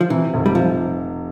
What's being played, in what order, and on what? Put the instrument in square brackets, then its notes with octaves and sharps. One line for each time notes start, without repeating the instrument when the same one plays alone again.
[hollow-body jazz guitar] F3
[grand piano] C3 [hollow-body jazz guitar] E3
[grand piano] F1
[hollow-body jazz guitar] G3
[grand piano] C3 [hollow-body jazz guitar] F3